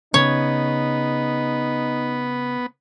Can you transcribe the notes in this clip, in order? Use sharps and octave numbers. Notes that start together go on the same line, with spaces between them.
C#3 B3 D#4 C#5